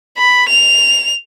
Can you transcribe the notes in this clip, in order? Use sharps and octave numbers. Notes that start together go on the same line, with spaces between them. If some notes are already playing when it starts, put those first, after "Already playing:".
B5
F7